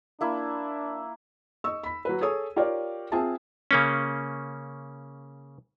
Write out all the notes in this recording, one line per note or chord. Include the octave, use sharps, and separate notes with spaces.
A#3 D4 E4
D#5 C#6 E6
B5 B6
F#3 B4
G#4 A4 C#5 D#6
F4 G4 A#4 C#5 D5 F5
C4 F4 G#4 E5 G#5 A5
C#3 A#3 C#4